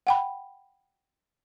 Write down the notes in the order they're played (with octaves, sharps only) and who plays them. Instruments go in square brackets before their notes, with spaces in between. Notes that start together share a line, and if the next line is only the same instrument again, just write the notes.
[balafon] F#5 G5 B5